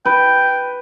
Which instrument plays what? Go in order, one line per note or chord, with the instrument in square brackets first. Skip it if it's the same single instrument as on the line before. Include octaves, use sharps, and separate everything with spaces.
[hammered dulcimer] B4 [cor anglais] G5